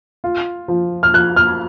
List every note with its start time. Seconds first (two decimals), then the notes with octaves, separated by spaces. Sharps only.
0.24 F4
0.68 F3
1.03 F6
1.14 F3 F#6
1.36 F6